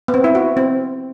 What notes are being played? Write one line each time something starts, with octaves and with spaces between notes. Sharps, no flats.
B3
C4
E4
F#4
C4